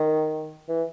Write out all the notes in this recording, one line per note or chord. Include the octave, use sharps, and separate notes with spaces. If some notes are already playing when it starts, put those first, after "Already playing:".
Already playing: D#3
E3